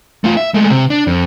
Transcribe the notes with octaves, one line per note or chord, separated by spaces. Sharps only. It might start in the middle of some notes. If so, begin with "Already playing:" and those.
A3 F4
E5
G#3 A3
C3
D4
F2